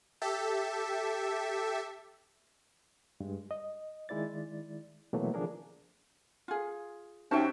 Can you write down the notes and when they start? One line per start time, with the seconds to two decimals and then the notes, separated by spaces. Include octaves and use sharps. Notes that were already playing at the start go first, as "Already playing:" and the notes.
0.22 G4 A4 E5
3.20 G2 G#3
3.51 D#5
4.09 D#3 G#3 E4 D5 A6
5.13 B2 E3 F#3 A3 A#3
5.34 D3 D#3 F3 D4 G#4 A#4
6.48 F4 G#4
7.31 C3 C#4 D#4 F#4 C5 E5 G5 A5